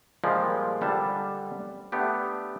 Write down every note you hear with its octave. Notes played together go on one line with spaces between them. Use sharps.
A#2 F3 G3 G#3 F4 G4
D3 G3 D4 A5
A3 B3 D4 G4